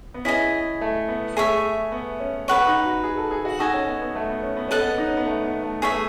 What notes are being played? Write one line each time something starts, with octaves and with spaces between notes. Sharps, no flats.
B3
C#4 E4 G#4 D#5 G#5
A3
B3
A3 G#4 C#5 E5
B3
C#4
C#4 B4 F#5 C#6
D#4
F#4
G#4
A4
G#4
F#4
D#4 F#4 A4 D#5 G#5
C#4
B3
B3
A3
B3
C#4
B3
C#4 A4 D#5 F#5 A5
B3
D#4
C#4
B3
A3
B3
A3
B3 G#4 C#5 E5
A3